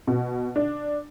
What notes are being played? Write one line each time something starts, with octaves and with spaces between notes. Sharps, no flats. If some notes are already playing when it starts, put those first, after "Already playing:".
B2
D4